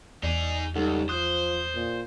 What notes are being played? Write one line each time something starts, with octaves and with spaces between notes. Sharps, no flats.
E2 D#4 G#4 D5
C#2 G3 D#4 A4 F#5
F3 C5 D#6 F#6
A#2